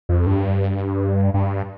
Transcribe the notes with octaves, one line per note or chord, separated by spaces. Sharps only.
F2
G2
G2